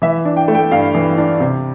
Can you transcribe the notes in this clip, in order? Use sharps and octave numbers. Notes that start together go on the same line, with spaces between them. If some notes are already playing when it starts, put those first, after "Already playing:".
E3 E5
D4
G5
A3
G5
G2 F5
E3
D4
C3